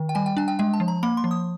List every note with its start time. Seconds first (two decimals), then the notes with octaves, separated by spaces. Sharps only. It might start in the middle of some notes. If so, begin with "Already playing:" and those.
Already playing: D#3
0.09 G5
0.15 G3 G#5
0.26 G5
0.37 D4 G#5
0.48 G5
0.59 G#3 G5
0.74 A5
0.80 F3
0.88 A#5
1.03 A#3 B5
1.17 C6
1.24 F3
1.31 D#6